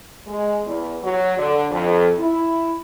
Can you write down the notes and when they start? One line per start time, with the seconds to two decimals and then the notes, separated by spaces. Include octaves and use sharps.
0.26 G#3
0.66 E2
1.02 F#3
1.37 D3
1.69 F2
2.18 E4